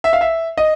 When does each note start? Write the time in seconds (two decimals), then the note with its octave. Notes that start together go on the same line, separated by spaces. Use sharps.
0.04 E5
0.13 F5
0.21 E5
0.58 D#5